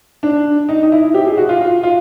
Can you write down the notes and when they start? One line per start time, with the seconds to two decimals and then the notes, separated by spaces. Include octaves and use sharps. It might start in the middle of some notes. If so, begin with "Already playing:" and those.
0.23 D4
0.69 D#4
0.83 D#4
0.92 E4
1.14 G4
1.27 G#4
1.37 F#4
1.49 F4
1.61 F4
1.83 F4